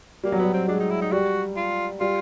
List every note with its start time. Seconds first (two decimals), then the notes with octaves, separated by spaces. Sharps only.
0.24 G3 A#3
0.32 F#3
0.39 G3 B3
0.53 C4
0.68 G#3 D4
0.80 D#4
0.90 E4
1.02 D#4
1.12 G3 F#4
1.56 F4
2.00 G3 F4